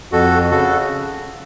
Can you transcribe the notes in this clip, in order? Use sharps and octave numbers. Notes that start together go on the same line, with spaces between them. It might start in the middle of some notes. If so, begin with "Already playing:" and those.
F2 F#4 A4
C#3 F#4 A4